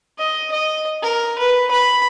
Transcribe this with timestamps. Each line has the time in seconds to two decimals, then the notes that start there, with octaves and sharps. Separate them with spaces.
0.18 D#5
0.51 D#5
1.02 A#4
1.38 B4
1.71 B5